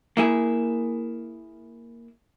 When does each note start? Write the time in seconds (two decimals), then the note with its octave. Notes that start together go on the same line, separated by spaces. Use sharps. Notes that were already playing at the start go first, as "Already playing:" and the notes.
0.17 A#3 E4 G#4